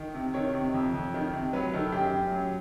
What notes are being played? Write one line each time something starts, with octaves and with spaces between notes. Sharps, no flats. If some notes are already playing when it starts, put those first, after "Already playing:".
Already playing: D#3
C3
D#3 C#5
C3
F2
F2
D#3
C3
F#3 B4
D#3 A4
F#2 G4
F#2
F#3